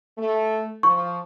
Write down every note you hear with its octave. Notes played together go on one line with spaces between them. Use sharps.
A3
F3 C#6